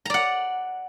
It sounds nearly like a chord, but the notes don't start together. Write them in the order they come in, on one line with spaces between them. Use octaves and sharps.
A#5 D5 F#5